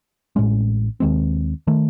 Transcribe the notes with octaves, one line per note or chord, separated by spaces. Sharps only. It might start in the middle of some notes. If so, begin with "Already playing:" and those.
A1 A2 G#3 C#4
D#2 D#3 G#3 C4
D#3 A3